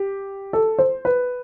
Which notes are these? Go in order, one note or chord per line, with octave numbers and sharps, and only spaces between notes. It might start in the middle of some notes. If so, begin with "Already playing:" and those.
Already playing: G4
A4
C5
B4